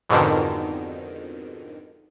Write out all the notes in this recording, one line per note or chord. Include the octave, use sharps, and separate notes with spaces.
F2 G#2 B2 D3 D#3